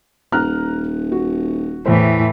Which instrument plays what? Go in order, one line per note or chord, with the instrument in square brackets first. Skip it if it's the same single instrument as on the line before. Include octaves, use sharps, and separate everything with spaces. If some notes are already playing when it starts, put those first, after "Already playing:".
[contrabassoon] D#1 [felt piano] A#5 F6 F#6
[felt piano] F#4
[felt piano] E2 C5 [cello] A2 E3